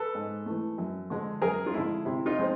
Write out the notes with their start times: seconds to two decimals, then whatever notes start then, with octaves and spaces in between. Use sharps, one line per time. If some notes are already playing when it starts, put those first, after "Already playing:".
Already playing: A4 B4
0.15 G#2
0.46 E3 A3
0.78 F#2
1.10 D3 F3 G#3
1.42 F#2 G#4 A#4
1.66 F4
1.74 D3 F3 G#3 E4
2.05 C3 E4
2.26 D#4 F4
2.37 F3 G#3 C4